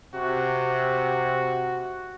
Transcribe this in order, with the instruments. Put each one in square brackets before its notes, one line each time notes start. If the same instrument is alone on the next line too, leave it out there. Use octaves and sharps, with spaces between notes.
[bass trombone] C3 [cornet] F#4